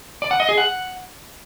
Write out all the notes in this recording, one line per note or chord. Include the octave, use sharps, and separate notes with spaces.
D5
F#5
D#5
G#4
F#5